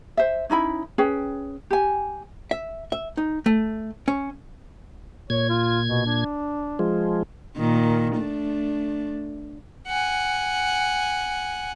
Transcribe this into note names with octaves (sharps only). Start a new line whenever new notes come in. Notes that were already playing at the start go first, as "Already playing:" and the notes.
C5 E5
C#4 D#4 E4 B5
C#4 G#4 B4 G5
G4 G#5
E5
E5
D#4
A3
C#4
A#2 C#5 G#6
F4
B2
D4
F3 G#3
A#2 D#3
A3 D4
F#5 G#5